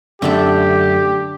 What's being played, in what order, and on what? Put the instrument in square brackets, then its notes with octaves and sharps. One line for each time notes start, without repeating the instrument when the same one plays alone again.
[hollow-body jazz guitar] F#2 A3 E5 [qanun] D3 D4 [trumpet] G4